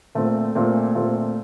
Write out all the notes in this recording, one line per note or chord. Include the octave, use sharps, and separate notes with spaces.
A#2 A3 C4
A#2 A3 C4
A#2 A3 C4 F4